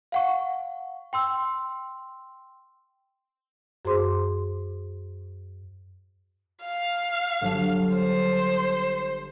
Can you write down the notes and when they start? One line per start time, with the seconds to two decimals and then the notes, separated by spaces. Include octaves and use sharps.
0.12 F5 F#5 C#6
1.13 G5 C6 E6
3.85 F#2 F#4 G#4 C5 C6 D6
6.64 F5
7.41 G1 F#3 A5
7.95 C5